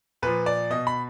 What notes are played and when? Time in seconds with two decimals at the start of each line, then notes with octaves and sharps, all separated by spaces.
0.22 A#2 F3 B4
0.46 D5
0.70 B2 D#5
0.87 B5